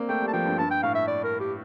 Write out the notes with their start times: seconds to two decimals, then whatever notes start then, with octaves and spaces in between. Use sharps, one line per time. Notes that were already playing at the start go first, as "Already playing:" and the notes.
Already playing: A#3 C4 D4
0.09 A3 G5
0.21 G3
0.28 A5
0.33 F3 G5
0.46 G2
0.58 G2 A5
0.71 G5
0.83 A2 F5
0.95 E5
1.08 D5
1.24 A#4
1.40 G4